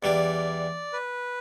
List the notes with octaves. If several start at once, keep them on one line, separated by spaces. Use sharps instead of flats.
E2 E3 G3 D4 D5
B4